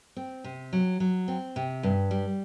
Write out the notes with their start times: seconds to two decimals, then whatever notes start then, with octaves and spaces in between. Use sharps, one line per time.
0.16 C4
0.44 C3
0.73 F#3
1.00 F#3
1.28 C4
1.56 C3
1.83 G2
2.11 G3